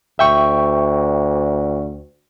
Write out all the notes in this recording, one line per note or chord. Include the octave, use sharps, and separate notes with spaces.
D2 E5 G5 C#6